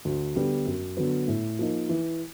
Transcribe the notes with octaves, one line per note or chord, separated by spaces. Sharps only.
D2
D3 G3 B3
F#2
D3 F#3 B3
A2
F3 A#3 D#4
E3